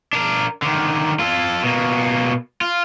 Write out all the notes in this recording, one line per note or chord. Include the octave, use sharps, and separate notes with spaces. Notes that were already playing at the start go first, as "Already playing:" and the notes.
D4 A#4
D3 D#3
F4 A4
B2 A#3
F4